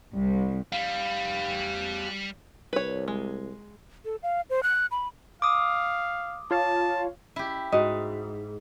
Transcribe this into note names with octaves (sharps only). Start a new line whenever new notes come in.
C2
G3 G4 F5
C2 B4 C#5
G#3
A4
F5
C5
F#6
B5
F5 D6 D#6
F4 C#5 F5 A5
E4 G4
G#2 F#4 D#5